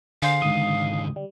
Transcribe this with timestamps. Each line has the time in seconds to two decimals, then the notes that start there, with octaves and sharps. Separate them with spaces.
0.22 D3 G#4 C5 F5
0.42 C#2 G#2 D#3 D#6
1.16 G3